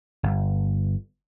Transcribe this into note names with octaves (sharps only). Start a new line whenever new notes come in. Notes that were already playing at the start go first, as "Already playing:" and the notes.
G1